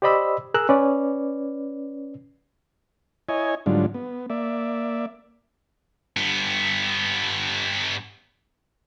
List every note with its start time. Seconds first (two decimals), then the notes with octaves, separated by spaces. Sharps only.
0.02 G4 C5 D5 D#5 B5 E6
0.54 G#4 A#4 E6 F#6
0.69 C#4 B4 D5
3.29 E4 C#5 D#5 G#5
3.66 G#2 D3 F#3 G3 D4 F4
3.94 B3
4.30 A#3 D5 E5
6.17 G2 B3